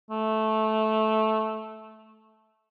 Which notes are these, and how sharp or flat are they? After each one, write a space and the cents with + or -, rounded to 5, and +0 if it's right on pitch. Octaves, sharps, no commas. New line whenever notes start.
A3 -10